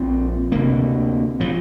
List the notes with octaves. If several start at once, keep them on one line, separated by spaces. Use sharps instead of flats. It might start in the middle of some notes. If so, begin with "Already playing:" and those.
Already playing: A#1 A#2 C4
D2 C3 A#3
A#2 F3